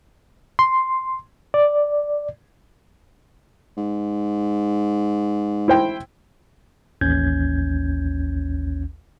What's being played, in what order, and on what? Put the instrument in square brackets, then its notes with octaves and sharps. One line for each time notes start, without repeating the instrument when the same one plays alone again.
[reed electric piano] C6
D5
[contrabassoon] G#2
[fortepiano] E4 C5 G5
[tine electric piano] A1 D#2 C#4 G6 G#6